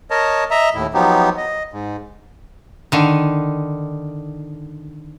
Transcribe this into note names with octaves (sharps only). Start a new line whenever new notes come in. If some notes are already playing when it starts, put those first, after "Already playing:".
A#4 C#5 D#5 A5
D#5 E5 A#5
D#2 A2 E4
F3 F#3 B3 D#4 G4
D#5
G#2
D3 D#3